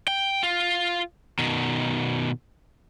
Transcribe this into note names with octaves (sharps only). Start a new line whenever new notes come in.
G5
F4
B2 D#3